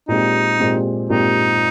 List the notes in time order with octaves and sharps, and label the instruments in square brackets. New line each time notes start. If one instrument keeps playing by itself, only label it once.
[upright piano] A#2 G#3 C4 G4 [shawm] D#4
[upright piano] A#2 G#3 C4 G4
[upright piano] A#2 G#3 C4 G4 [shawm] D#4